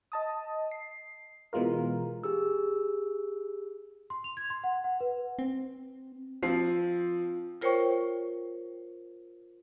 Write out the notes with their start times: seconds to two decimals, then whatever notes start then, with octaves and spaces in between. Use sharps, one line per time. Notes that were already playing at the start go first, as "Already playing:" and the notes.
0.12 D#5 A5 D#6
0.71 C7
1.53 B2 E3 G#3 F4 A#4
2.24 G4 G#4 E6
4.10 C6
4.24 F7
4.37 G#6
4.50 C6
4.64 F#5
4.84 F#5
5.00 B4
5.39 C4
6.43 F3 C4 F4 C7
7.61 F4 A#4 C5 C#5 G5 C#6